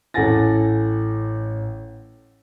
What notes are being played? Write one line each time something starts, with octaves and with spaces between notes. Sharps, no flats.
A1 A4 F#5 G#5 A6 A#6